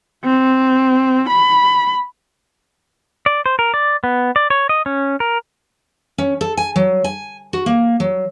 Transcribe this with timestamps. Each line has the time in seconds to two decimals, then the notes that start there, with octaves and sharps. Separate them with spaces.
0.24 C4
1.29 B5
3.26 D5
3.46 C5
3.59 A#4
3.74 D5
4.04 B3
4.36 D5
4.50 C#5
4.69 D#5
4.86 C#4
5.20 A#4
6.18 C#4
6.41 A4
6.57 G#5
6.76 F#3
7.04 G#5
7.53 F#4
7.66 A#3
8.00 F#3